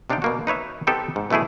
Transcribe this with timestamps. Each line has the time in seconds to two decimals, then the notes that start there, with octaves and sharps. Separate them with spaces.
0.10 C3 D4 D#4 F5 G5
0.22 B2 A#3 F#4
0.47 D#4 B4 C#5 E5
0.87 B3 C4 D#4 G4 A4 B4
1.16 G#2
1.30 B2 E3 A3 E4 G#4